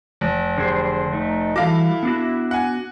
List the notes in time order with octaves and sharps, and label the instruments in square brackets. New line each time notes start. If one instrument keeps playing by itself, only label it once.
[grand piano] F1
[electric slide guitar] D3 G#4 C5 [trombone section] F#3 G3
[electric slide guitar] A3 [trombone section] D#4
[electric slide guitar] E3 G3 F#4 [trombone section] E4 [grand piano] A4 F5 D6
[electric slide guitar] B3 D4 F#4
[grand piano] F#5 G#5